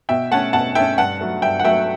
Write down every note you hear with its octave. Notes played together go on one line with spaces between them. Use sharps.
B2 E5 G5
A3 C#4 F#5 A5
B2 F#5 A5
A3 C#4 E5 G5
G2 F#5 A5
F#3 A3
G2 E5 G5
F#5
F#3 A3 E5 G5